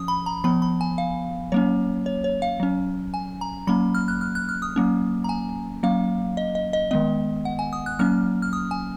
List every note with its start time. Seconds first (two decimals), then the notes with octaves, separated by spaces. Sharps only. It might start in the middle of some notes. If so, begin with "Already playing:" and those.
Already playing: F3 C#4 D#6
0.08 B5
0.26 A#5
0.44 F3 B3 B5
0.62 B5
0.81 G#5
0.98 F5
1.52 F#3 A#3 C#4 C#5
2.06 C#5
2.24 C#5
2.42 F5
2.60 F#3 C#4
3.14 G#5
3.41 A#5
3.67 F#3 A#3 C#4 B5
3.95 F6
4.08 F#6
4.21 F6
4.35 F#6
4.49 F6
4.62 D#6
4.76 F#3 A#3 C#4
5.24 A#5
5.29 G#5
5.83 F#3 A#3 C#4 F5
6.37 D#5
6.55 D#5
6.73 D#5
6.91 D#3 G#3 B3 D#5
7.45 F#5
7.59 G#5
7.73 D#6
7.86 F#6
7.99 F#3 A#3 C#4 F6
8.42 F6
8.53 D#6
8.71 G#5